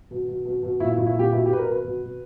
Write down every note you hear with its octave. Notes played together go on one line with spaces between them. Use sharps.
B2
B2
B2
B2
A#2 E4
E4
A#2
E4
A#2 G4
B2 E4
G4
B2 B4
A#4
B2 B4
B2
B2